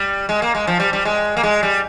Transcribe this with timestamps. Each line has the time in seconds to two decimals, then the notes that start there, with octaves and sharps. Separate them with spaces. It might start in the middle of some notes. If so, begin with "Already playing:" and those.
Already playing: G3
0.29 G#3
0.42 A#3
0.55 G#3
0.67 F3
0.80 G3
0.93 G3
1.05 G#3
1.37 A#3
1.43 G#3
1.63 G3